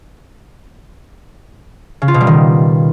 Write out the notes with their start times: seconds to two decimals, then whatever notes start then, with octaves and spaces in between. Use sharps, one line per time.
2.02 C#3
2.08 F4
2.14 B2
2.21 G3
2.27 D#3